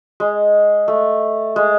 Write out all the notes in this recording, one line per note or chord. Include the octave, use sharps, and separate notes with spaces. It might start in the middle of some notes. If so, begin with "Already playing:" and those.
G#3
A3
G#3